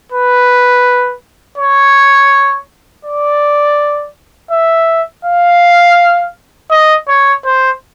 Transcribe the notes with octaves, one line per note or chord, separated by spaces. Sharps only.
B4
C#5
D5
E5
F5
D#5
C#5
C5